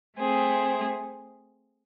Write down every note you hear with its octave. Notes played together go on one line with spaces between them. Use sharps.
A3 C4 G#4